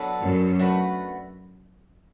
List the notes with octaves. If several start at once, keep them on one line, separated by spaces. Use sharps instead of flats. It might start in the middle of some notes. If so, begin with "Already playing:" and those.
Already playing: F#3 B3 D4 A4
F#2
A3 D4 F#4 B4